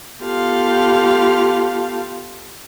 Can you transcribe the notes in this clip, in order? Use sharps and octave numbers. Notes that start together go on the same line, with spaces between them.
B3 F4 G4 A4 F5